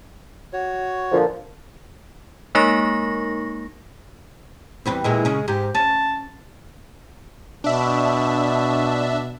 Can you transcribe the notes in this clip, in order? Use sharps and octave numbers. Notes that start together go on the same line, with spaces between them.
F#4 C#5
A#2 D3 F3
G#3 A#3 D#4 A#4 C#6 A#6
E2 G3 C4 B4
E2 A#2 E3 G#3
C#3 C#4
G#2 G4
C#4 A5
B2 D4 E5